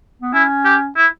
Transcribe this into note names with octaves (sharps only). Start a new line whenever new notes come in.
B3
C#4 E4
G4
E4